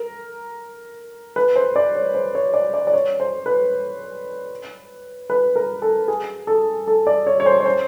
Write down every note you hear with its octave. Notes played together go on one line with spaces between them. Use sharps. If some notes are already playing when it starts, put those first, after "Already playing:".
Already playing: A#4
B4
C5
D5
C#5
C5
C#5
D5
D5
D5
C#5
C5
B4
B4
A#4
A4
G#4
A4
A4
D5
C#5
C#5
C5
C#5
C5